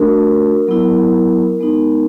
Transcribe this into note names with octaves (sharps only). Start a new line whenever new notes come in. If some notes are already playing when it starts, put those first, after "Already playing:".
Already playing: A3 D4 F#4 A#4
F#3 B3 E4
G#3 B3 D#4